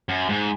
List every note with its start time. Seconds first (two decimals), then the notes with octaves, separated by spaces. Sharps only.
0.09 F#2
0.29 G#2